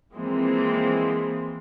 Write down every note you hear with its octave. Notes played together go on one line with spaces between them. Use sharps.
E3 F3 G#3 A#3 C4